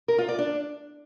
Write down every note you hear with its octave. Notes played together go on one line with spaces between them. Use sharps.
A#4
F4
D5
D4